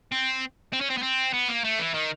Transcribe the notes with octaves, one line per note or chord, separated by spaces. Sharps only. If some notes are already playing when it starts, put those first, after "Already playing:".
C4
C4
C#4
C4
B3
C4
B3
A#3
A3
E3
D#3